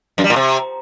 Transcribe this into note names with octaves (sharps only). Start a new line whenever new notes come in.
F#2
G3
A#2
C3